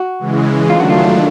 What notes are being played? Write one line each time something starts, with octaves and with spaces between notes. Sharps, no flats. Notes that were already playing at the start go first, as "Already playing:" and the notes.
Already playing: F#4
C#3 E3 G#3
D#3 F#3 A3 D4 F4
F#4
F4